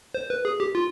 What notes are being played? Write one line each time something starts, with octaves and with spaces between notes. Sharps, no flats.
C5
B4
G#4
G4
F4